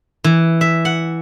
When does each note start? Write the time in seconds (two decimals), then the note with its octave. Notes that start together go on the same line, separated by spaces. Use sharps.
0.24 E3
0.61 E5
0.85 F#5